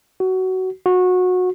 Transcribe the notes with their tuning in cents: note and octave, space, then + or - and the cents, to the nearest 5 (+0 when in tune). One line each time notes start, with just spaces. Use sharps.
F#4 +20
F#4 -20